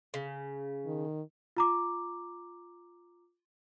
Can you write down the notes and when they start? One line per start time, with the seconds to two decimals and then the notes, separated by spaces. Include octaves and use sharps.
0.14 C#3
0.86 D#3
1.57 F4 A#5 D6